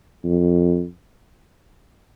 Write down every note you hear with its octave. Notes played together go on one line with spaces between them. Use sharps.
F2